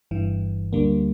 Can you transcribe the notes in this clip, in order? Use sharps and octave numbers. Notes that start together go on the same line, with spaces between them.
G1 G2 E3
D2 D3 G3 A#3